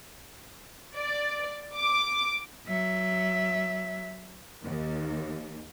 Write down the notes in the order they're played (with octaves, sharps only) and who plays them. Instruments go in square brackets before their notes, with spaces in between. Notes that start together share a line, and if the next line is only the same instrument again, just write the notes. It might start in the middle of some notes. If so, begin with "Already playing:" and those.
[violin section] D5
D6
[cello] F#3 E5
[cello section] D#2